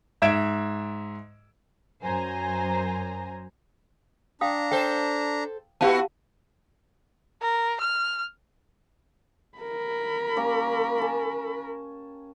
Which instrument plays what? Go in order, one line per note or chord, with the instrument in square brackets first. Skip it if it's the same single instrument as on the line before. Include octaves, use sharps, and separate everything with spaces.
[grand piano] G#2 E5 G#6 D7 E7
[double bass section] F#2 [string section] C5 G#5 A#5
[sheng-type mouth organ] D4 A#5 [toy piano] F5 G5 D#6
[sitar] A4 C5 [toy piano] G5
[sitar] B3 E4 F#4 [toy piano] G4 F5 A5
[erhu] A#4
F6
[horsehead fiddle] A#4 B5
[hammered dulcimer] A#3 C#4 G4
G#5 A5